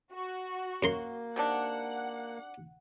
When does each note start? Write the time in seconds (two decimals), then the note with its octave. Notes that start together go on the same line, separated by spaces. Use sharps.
0.12 F#4
0.83 F#2 A#3 A#4 C6
1.36 C3 D#3 D4 F#5